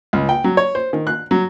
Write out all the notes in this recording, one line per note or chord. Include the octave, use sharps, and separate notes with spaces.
C#2
G5
F#3
C#5
C5
D#3
F#6
F#3